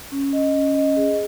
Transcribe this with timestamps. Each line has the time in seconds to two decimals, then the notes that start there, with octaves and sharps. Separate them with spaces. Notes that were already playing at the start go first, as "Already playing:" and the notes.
0.12 C#4
0.33 D#5
0.54 C#4
0.75 D#5
0.97 G#4